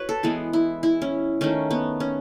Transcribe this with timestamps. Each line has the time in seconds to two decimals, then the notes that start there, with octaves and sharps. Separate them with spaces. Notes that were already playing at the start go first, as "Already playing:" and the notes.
Already playing: F#4 B4 C#5
0.09 A4
0.23 E3 G#3 B3 G#4
0.53 E4
0.83 E4
1.02 C#4
1.41 D#3 A3 C#4
1.71 B3
2.00 C#4